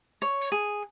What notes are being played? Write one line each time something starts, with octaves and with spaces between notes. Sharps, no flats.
C#5
G#4